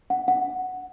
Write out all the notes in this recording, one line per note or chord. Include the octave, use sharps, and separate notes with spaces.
F#5
F#5